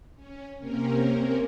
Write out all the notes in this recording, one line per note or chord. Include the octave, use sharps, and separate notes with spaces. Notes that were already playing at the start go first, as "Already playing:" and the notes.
C#4
C3 A#3 C4 C#4 A#4